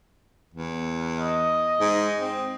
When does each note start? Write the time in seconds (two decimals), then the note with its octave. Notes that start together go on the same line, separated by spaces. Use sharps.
0.54 E2
1.19 D#5
1.80 G#2
2.19 C4